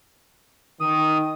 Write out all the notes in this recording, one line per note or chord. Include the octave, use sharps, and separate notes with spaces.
D#3 D#6